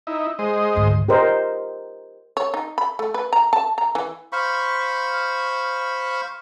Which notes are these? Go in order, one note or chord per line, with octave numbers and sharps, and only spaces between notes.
D#4 E4
G#3 C5 D#5
D2 G#2
G4 A#4 C5 D#5
C#5
D#4
B5
A3
B4
A#5
A5
A#5
E3
C5 F5 B5 C#6